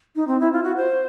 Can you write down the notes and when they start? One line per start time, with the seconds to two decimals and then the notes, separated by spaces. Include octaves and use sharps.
0.16 D#4
0.27 C4
0.40 E4
0.52 F4
0.64 F#4
0.77 C5